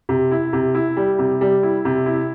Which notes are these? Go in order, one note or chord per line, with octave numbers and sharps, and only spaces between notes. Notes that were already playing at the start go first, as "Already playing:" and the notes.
C3
E4
C3
E4
G3
C3
G3
E4
C3
E4